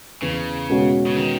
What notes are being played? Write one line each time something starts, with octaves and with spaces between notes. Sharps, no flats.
E2 C#3
B2 G#3 C#4 F#4
C#3
D#3